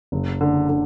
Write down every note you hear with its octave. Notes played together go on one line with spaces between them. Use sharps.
F#1
D3
D3